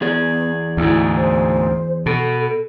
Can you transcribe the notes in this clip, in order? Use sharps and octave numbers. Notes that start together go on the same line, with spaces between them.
E2 B3 G#4 D5
D2 G#2 E4
C5
B2 A4